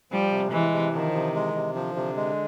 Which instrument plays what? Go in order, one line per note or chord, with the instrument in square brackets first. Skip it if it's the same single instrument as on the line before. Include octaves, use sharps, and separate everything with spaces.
[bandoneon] F3 [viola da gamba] G3
[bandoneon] C3
[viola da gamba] E3 [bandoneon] G#3
[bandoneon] C3
[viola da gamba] D#3 [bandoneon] F3
[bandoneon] C3
G#3
C3
[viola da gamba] D3 [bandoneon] F3
[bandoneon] C3
G#3